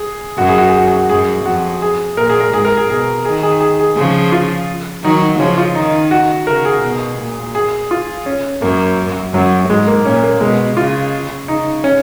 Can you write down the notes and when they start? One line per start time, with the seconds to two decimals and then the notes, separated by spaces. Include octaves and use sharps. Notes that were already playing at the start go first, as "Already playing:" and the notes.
Already playing: G#4
0.38 F#2 F#4
0.49 G#4
0.58 F#4
0.67 G#4
0.77 F#4
0.87 G#4
0.97 F#4
1.09 F#2 G#4
1.45 F2 F#4
1.82 G#4
2.17 A#2 A#4
2.29 G#4
2.41 A#4
2.53 G#2 G#4
2.65 A#4
2.77 G#4
2.90 B2 G#4
3.25 D#3 G#4
3.43 G#4
3.61 G#4
3.79 G#4
3.96 C#3 F3 G#4
4.32 F4
5.04 D#3 F#3 D#4
5.40 C#3 F3 C#4
5.58 F4
5.75 D#3 D#4
6.11 F#4
6.47 C#3 A#4
6.65 G#4
6.83 B2
7.19 A#2
7.55 G#4
7.91 F4
8.26 C#4
8.62 F#2 A#3
9.34 F#2 F#3
9.69 G#2 G#3
9.87 A#3
10.05 A#2 C#4
10.24 A#3
10.41 B2 G#3
10.77 C#3 F4
11.48 C#3 D#4
11.84 C#4